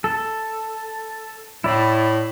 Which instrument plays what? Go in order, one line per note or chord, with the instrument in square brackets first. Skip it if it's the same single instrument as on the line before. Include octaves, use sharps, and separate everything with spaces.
[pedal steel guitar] A4
[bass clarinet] A2 [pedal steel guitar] E4 D5 B5